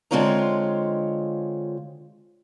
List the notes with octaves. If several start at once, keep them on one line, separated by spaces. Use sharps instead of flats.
D3 G#3 C4 F4 C#5 A#5